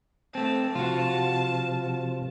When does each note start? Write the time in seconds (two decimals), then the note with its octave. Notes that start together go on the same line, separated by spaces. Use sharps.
0.35 A3 C4 A5
0.75 C3 F3 F4 F#4